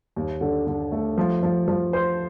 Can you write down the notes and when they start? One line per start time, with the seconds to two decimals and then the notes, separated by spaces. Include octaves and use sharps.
0.16 D#2
0.41 D3
0.67 D3
0.92 A3
1.18 F3
1.43 F3
1.68 F3
1.93 C5